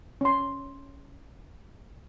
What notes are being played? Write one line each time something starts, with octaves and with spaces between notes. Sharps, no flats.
C#4 C6